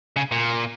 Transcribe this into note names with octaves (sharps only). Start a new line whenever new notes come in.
C#3
A#2